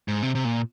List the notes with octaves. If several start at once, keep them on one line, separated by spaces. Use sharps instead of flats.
G#2
C3
C3
A#2